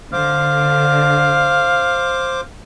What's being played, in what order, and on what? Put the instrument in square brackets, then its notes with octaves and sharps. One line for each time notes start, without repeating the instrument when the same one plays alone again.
[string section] D3 [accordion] C5 D6 [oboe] F5